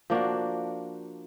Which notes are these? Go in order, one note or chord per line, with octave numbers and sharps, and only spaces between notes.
F3 A#3 D4 F#4